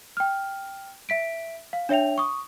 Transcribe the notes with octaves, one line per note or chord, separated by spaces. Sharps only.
G5 F6
E5 B6 D7
F5
D4 C#5 E5 G5 F7
C#6 D#6